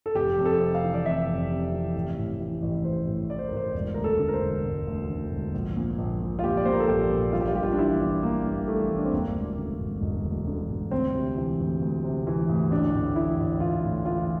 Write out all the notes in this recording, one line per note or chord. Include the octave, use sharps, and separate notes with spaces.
A4
F1 G4
F2
A4
C3
F5
E3
D5
F1 E5
F2
C3
E3
A1
A2
E3
A1
A1 C5
A2
E3 D5
C5
A#4
A1 C5
E1
D2 A#4
A4
D3
A#4
C5
E1
E1
D2
D3
E1
A#1
A#2
A#1
A#2
F4
A#1 G4
D5
A#2 C5
A#4
A4
A#1 G4
A#2
G1 F4
G4
F4
G2 G4
F4
D4
E3 E4
G1
G1 A#3
G2
E3 A3
G1
D4
C4
E1 A#3
D2
D3
E1
E1
D2
D3
E1
D2 C4
C3
E3
D2
D2
C3
E3
D2
A1 D4
A2
E3 E4
A1
A1 F4
A2
E3 F4